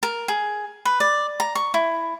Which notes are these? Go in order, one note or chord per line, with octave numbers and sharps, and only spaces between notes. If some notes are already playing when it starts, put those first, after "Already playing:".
A#4
G#4
B4
D5
A#5
C#6
E4